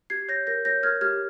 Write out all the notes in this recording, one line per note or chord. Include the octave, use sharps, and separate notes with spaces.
G4 G#6 C7
C#5 G6 A#6
A#4 G6 A#6
C#5 G6 A#6
A#4 F6 G#6
G4 F6 G#6